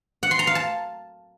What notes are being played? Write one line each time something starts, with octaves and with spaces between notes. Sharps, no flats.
F#5
C6
A#5
F5
A5